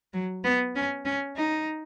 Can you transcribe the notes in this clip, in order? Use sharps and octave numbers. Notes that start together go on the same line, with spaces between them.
F#3
B3
C#4
C#4
D#4